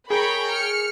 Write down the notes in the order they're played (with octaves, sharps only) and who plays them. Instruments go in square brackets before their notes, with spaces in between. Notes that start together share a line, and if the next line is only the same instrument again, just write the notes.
[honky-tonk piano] G#4 [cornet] A#4 [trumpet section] C#5 G5 [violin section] A#5 B5 C#6
[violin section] F6 C#7